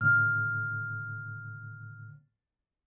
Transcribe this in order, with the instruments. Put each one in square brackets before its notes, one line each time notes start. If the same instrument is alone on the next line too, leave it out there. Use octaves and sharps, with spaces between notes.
[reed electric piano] A2 D3 [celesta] F6